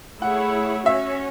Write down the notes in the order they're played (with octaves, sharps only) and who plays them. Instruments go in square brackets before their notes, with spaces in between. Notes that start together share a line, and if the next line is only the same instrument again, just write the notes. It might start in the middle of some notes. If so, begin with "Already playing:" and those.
[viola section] A3 E4 G#4 C#5 [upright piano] F#5
[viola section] C#4 F#4 C#5 [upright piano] E5